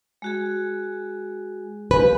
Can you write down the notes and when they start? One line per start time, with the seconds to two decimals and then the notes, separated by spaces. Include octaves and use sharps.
0.22 G#3 F#4 G#4
1.91 G4 B4 F5 G#5